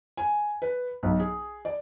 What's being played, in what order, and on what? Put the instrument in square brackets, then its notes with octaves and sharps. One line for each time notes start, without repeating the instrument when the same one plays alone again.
[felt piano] G#5
B4
B1
G#4
D5